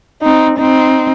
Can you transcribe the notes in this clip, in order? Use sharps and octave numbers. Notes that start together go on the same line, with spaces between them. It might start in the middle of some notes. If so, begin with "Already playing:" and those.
C4 D#4
C4 D#4